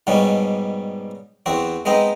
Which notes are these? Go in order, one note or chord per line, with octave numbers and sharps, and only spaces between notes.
G#2 B2 G3 C#4
E2 C4 F#4
G#3 B3 C4 D#4